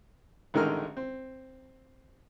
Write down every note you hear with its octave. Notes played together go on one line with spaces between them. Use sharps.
A1 D3 D#3 G#3 A#4 F6
C4